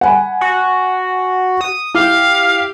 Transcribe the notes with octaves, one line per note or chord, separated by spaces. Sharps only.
F#5 G#5 B5
F#4
D#6
E4 G4 F5